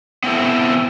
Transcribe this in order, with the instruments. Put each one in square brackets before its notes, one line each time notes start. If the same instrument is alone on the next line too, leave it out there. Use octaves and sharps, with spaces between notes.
[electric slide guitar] B3 C4 E4 A4